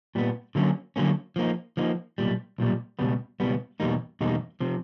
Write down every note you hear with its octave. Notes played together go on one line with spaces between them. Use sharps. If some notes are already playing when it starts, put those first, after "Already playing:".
A#2 G3 B3
D3 F#3 A#3 C#4
D3 F#3 A#3 C#4
F3 A#3 D#4
F3 A#3 D#4
B1 A#2 G3
B1 A#2 G3
C#2 B2 G3 B3
C#2 B2 G3 B3
E2 B2 G3 A#3 D#4
E2 B2 G3 A#3 D#4
C3 F3